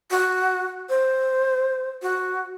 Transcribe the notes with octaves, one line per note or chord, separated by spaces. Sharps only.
F#4
C5
F#4